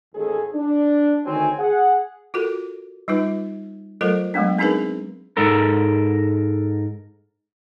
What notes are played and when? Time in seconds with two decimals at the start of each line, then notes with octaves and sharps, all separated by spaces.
0.15 A1 D#2 G#4 A4
0.54 D4
1.25 D2 D#3 C4 C#5 G#5
1.58 G#4 F#5
2.34 F4 F#4 A4 A#4
3.08 G3 D#4 F4 B4
4.01 F#3 A3 F4 A4 A#4 C5
4.34 F#3 G#3 A3 B3 D4
4.58 C4 D4 D#4 G#4 A#4 B4
5.37 G#2 A4 A#4